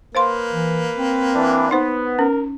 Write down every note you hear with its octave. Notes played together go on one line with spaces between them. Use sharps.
A#3 B4 C5 F5 C6
E3
C4
E3 D4
B3 D#4 C5
C#4 A#4